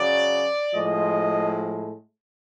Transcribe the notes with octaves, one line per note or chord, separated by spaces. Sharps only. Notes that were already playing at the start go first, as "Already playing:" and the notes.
Already playing: C#3 F#3 D5
A2 F3 G#3 D#5